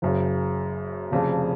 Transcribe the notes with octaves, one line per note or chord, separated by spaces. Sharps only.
F#1 F#2 C#3
F1 F2 C#3 F3